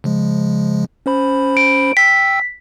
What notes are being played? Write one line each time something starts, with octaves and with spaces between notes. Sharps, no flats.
C#3 F3 G#3
C#4 C5 B5
D7
G5 E6 B6